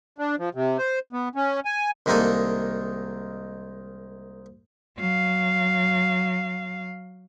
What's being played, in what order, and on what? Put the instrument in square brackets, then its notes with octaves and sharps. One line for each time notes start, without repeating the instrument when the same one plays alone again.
[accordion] D4
F3
C3
C5
B3
C#4
G#5
[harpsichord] C2 D#3 G#3 A#3 D#4 A4
[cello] F#3 F5